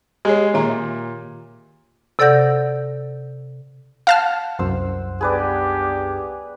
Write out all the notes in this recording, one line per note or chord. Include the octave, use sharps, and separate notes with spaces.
G#3 G4 G#4 C#5
A#2 D#3 E5 A#5
C3 A4 D5 F#5 G6 A#6
F5 F#5 A5 F6
C2 F#2 C5 E6
B3 D4 G4 G#4 B4 D5